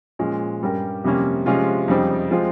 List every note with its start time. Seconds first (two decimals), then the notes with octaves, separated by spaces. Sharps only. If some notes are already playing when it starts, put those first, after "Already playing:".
0.19 A#2 F3 G#3 C#4
0.62 G2 G3 C#4 G4 A#4
1.04 F2 C3 G3 A#3 C#4
1.46 C3 F3 G#3 C#4 F4
1.88 F2 C#3 G3 C4 D#4
2.30 F3 G#3 C4 F4